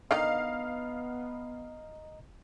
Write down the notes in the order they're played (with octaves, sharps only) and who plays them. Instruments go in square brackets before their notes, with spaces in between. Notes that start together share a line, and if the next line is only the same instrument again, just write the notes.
[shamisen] D3 D#3 D#4 [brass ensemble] B3 [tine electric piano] D#5 A#5 [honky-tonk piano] F5